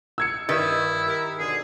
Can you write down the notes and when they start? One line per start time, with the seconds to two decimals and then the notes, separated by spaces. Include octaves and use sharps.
0.18 E6 G#6 C#7
0.49 G2 D#3 E4
1.07 A#4
1.38 F2 B2 D3 G#4